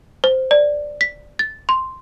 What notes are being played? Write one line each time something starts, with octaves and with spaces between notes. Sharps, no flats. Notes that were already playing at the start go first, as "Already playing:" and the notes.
C5
D5
B6
A6
C6